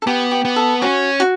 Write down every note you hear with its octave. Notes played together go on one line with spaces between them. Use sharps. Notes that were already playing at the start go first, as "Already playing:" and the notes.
A4
B3 G4
G4
B3
A4
C#4 F#4
F#4